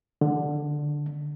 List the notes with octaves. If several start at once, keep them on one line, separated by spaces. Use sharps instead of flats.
D3